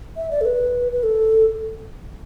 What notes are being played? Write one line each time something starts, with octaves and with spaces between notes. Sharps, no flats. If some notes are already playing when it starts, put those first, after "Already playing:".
E5
D5
A4
B4
B4
A4